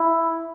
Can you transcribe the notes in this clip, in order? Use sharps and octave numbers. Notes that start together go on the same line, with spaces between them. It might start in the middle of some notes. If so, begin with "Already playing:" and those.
Already playing: E4